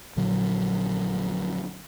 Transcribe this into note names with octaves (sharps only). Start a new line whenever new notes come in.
A#1 A#2 D3 F#3